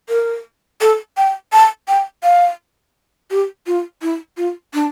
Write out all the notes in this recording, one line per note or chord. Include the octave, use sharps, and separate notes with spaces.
A#4
A4
G5
A5
G5
F5
G4
F4
E4
F4
D4